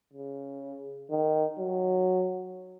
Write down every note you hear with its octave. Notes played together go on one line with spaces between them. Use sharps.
C#3
D#3
F#3